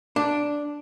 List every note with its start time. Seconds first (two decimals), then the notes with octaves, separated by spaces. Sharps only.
0.16 D4